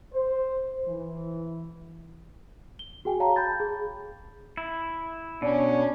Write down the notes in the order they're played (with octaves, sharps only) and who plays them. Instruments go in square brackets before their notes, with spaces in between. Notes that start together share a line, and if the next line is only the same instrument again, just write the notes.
[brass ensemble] C5
E3
[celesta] G7
F#4 G#4 G5 G#5
C#5 F5 G5 A5 A#5
B5 G6 A6
G#4
[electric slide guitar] E4
[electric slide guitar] B2 [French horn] C#4 [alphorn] D4